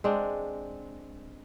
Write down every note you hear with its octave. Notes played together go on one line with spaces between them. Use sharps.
G#3 C4 D4